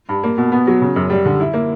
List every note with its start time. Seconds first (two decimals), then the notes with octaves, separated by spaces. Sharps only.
0.09 G2
0.23 A#3
0.37 B2
0.52 B3
0.67 F#3
0.81 C#3
0.96 F#2
1.10 G3
1.25 D3
1.40 E4
1.53 A#3